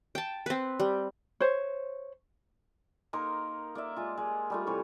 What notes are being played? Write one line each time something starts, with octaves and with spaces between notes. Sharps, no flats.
G5 A5
C4 B4
G3
C5 C#5
A#3 D#4 A#4 C6
A#3 D5 E5
G#3 F4
G#3
G3 A3 F4
C3 E3 C#5